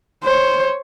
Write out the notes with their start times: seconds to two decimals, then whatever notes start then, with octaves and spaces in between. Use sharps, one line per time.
0.24 C5 C#5